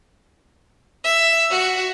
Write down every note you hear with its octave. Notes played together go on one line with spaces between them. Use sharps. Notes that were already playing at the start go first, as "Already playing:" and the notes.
E5
F#4